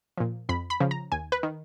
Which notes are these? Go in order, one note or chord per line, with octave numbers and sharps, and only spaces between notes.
A#2 F3
F2 B5
B5
C#3 F3
A#5
D#2 G#5
B4
D#3